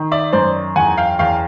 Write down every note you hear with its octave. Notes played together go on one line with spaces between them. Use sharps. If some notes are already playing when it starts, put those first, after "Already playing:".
Already playing: D#3
D5 E5
F#2 C5 D5
E2 F#5 G#5
F5 G5
E2 F5 G5